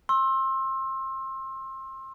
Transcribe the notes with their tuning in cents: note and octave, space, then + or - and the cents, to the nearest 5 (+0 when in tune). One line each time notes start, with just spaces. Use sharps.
C6 +30 E6 +0